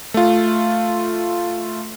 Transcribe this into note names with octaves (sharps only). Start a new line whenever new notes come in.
A3 F4